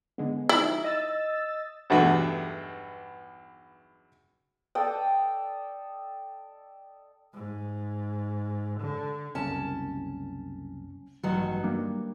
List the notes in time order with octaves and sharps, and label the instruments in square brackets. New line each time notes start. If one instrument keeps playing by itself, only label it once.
[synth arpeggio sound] D3 G#3 B3
[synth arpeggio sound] F3 D#4 [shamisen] E4
[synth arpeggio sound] D#5 E6 A6
[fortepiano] B1 E2 G2 A3 F#4 B4
[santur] A4 D5 D#5 G5
[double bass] G#2
D3
[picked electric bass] F#1 C2 [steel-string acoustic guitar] C#4 A5
[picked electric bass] A1 [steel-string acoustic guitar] G2 D#3 F#3
[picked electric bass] G3 A#3 D4